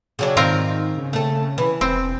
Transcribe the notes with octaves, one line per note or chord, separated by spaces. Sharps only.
C#3 F#3 D4
G#2 D#3 C4 F4 A#4
C#3
A3 A4
E3
E1 C4